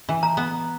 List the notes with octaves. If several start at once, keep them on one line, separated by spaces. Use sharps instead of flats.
E3
A#5
B3